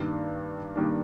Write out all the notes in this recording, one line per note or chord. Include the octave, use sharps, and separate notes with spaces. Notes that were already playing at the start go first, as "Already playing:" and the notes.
Already playing: G2 D#3 G3 A#3 D4
D#3 G3 A#3 D4